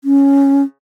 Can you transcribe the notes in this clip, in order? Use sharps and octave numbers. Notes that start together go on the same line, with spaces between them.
C#4